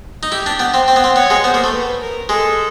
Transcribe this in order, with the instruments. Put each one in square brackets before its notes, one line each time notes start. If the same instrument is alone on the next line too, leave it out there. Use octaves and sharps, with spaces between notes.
[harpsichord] D#4
[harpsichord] E4 [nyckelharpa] G4
[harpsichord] D4
B3
C4
C4
B3
C4
[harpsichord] B3 [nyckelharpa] C#5
[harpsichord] G#3
[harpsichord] B3 [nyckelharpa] C5
[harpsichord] A#3
A3
[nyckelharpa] B4
A#4
[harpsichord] G#3 [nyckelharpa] A4